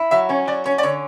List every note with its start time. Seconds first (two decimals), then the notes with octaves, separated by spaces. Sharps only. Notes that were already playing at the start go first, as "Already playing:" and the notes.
Already playing: E4
0.11 F#3 E5
0.29 C#4 C#5
0.47 F#3 D5
0.66 C#4 C#5
0.78 D5
0.83 D3 C#5